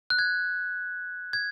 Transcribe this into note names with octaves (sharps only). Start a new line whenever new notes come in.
F#6
G#6
G#6